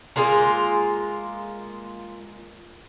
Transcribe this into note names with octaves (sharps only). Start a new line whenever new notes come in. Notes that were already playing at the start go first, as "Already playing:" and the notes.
G#3 A#3 F4 A#5